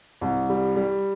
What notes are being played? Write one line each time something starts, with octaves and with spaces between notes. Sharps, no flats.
C2
G3
G3